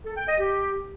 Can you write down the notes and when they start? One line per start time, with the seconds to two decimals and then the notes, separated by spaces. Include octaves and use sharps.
0.05 A4
0.17 G5
0.28 D#5
0.39 G4